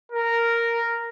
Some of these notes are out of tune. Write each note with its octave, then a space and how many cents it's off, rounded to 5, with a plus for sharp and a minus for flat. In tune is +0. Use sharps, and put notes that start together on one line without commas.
A#4 -5